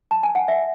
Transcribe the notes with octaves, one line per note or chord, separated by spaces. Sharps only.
A5
G#5
F#5
E5